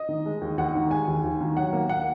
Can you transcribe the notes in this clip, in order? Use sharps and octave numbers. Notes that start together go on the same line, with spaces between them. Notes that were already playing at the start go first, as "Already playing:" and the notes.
Already playing: D#5
D#3
G#3
D#2
D#2 F#5
D#3
G#3 G#5
D#2
D#2
D#3
F#3 F#5
A#3
F#5